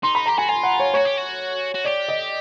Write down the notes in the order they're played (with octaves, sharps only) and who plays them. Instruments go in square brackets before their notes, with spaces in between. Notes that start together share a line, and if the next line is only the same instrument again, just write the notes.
[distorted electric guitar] D#4 [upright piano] C6
[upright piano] B5
[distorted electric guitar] G4 [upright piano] A#5
[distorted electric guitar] F#4 [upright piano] G#5
[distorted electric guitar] F4 [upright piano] G#5
[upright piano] F#5
C#5
[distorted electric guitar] F#4 [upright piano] C#5
[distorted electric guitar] G4
F#4
F#4
[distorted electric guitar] G4 [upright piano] D5
[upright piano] D#5